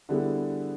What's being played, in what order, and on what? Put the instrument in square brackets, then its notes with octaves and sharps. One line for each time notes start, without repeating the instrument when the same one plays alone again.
[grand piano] D3 G3 B3 E4 G#4